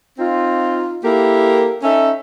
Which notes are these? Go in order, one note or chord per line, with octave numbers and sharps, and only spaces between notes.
C4 D#4 F4
A#3 E4 G4 A4 A#4
C#4 D#4 A4 E5